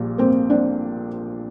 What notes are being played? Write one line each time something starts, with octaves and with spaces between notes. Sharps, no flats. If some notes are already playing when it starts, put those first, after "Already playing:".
Already playing: A#1 A#2 G3
A#3 C4
C4 D4